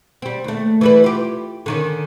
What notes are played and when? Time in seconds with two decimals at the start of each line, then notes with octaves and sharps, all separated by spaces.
0.22 G3 C4
0.44 D#2 A3
0.81 E3 G3 B4
1.04 F4 G4
1.66 D3 D#3 C#4